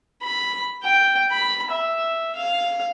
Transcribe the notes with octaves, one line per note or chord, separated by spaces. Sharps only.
B5
G5
B5
E5
F5